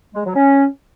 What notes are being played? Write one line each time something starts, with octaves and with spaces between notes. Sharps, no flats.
G#3
F#3
C#4